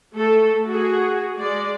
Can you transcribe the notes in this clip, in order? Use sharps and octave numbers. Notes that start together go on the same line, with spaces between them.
A3 A4
F#4 G#4
G#3 D5